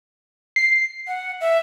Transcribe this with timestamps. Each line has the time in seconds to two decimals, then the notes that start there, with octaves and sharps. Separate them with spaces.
0.56 C7
1.07 F#5
1.41 E5